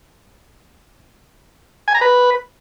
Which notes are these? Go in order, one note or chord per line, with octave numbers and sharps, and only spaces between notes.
G#5
A#5
B4